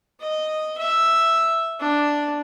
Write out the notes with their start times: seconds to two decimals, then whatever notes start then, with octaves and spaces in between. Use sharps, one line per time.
0.20 D#5
0.77 E5
1.79 D4